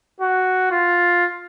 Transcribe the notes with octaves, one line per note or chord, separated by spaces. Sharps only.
F#4
F4